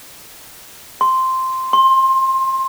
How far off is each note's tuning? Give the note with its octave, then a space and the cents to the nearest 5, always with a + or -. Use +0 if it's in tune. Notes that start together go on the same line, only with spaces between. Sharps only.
C6 -5
C6 +20